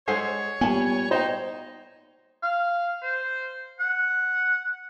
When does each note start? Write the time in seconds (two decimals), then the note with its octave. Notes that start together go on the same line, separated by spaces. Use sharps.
0.08 G#3 A4 C5 C#5 F#5 C7
0.61 A#2 G3 B3 G#5 A5
1.11 D#4 C5 G5
2.43 F5
3.02 C5
3.79 F#5